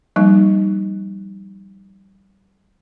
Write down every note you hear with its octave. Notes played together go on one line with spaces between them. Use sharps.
F3 G3 A#3 D#4